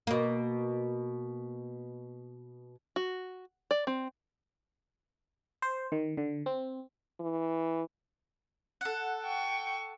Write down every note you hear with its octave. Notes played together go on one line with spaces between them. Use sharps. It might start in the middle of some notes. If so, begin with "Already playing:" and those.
B2 A#3
F#4
D5
C4
C5
D#3
D3
C4
E3
A4 F#5
G5 C#6